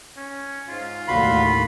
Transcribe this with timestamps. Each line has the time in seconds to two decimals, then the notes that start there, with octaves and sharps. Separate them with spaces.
0.17 C#4
0.69 G#2 F4
1.08 D#2 A2 D3 F#4 F5 B5 C6